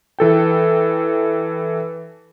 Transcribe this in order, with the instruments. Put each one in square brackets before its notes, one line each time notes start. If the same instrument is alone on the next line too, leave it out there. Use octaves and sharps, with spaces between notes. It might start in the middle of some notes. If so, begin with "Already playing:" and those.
[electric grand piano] E3 A4 G5